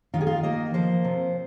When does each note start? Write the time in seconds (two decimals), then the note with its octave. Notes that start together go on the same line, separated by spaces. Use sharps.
0.14 D#3 F4
0.21 G#4
0.27 F4
0.43 A#3 D#5
0.74 F3 C5
1.04 C3